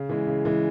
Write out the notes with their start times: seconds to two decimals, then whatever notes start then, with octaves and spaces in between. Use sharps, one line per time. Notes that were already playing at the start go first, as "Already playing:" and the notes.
Already playing: C#3
0.09 E3 G#3
0.27 C#3
0.45 E3 G#3